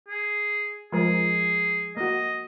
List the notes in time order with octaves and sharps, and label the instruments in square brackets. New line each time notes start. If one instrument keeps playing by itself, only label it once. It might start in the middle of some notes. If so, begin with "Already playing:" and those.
[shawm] G#4
[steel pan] F3 G#3 A#4 [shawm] G#4
[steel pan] A#3 F#4 [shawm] D#5